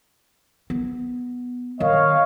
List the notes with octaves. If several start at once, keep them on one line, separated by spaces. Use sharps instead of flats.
B3
D#3 C#5 D#5 F5